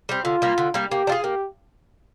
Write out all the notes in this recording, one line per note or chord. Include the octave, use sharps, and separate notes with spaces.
G3 C4
D3 F4
G3 A#3
D3
G3 A#3
A#3 G4
D4 F4 G#4
A#3 G4